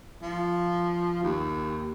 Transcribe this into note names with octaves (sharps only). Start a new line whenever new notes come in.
F3
D#2